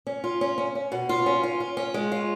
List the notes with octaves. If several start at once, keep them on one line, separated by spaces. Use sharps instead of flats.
C#4
F4
C#4
C#4
C#4
B2
F4
C#4
F4
F4
C#4
G#3
F4